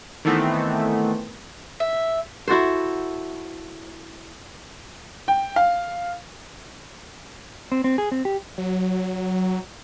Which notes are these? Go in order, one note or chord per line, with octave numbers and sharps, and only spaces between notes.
D#3 E3 A3 B3 C4
E5
E4 F#4 A4 C5
G5
F5
C4
C4
G#4
C4
G4
F#3